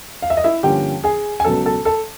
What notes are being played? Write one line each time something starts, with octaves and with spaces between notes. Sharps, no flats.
F5
E5
D#5
E4 E5
G2 D3 F3 A#3 C#4 G4 G5
G#4 G#5
G#5
C#2 B2 F#3 B3 A4 A5
A4 A5
A4 A5